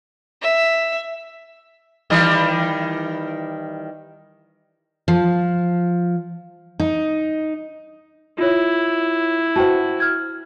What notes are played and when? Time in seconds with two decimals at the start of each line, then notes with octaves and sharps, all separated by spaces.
0.42 E5
2.10 D#3 E3 G3
5.08 F3
6.80 D#4
8.38 E4 F4 C#5
9.56 F#4 C5 F#5 G5 A5
10.00 F6 G#6